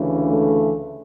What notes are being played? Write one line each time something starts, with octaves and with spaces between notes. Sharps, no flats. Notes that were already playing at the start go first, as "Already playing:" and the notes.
Already playing: D2 C#3 E3
A3